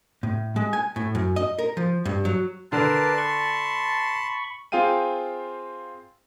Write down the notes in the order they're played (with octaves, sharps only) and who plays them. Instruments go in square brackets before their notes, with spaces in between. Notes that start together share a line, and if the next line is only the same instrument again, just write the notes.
[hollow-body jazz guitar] A2
G#3
G#5
A2
F#2
D#5
A#4
F3
G2
F#3
[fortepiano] D3 D4 [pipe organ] A#4 B4 D5 [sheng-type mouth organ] A5 C6
[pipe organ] B5 C#6
[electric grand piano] C4 F4 G#4 F5 G5 D#7